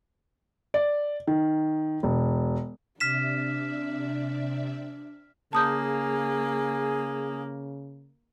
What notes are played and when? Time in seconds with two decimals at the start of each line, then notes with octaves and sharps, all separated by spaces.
0.74 D5
1.27 D#3
2.03 E1
3.00 C3 D4 D5 E5 F6 B6 E7
5.53 C#3 A#3 G#4 A5 D#6 G6